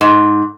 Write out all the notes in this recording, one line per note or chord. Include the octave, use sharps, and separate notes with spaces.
G#2